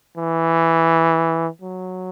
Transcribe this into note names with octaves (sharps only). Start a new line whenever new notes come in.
E3
F#3